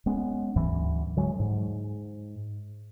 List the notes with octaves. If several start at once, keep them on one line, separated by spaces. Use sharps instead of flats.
G#3 B3 C#4
D2 G#2 E3 F#3
D3 F#3 G#3
G#2